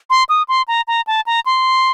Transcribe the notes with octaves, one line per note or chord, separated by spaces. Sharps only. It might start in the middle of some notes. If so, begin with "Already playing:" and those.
C6
D#6
C6
A#5
A#5
A5
A#5
C6